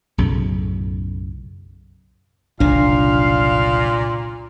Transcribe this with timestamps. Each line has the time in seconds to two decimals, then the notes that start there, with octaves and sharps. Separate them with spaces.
0.18 B1 F#2 A2 C#3
2.60 F#1 C2 A#2 D#3 D4 F5